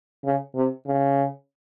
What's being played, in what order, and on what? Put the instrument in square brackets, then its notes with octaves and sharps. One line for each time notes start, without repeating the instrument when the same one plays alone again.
[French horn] C#3
C3
C#3